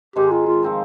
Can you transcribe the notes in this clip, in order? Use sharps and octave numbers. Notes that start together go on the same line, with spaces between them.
G#2 D#3 G#3 C4 G4
F4
F4
F3 C4 D#4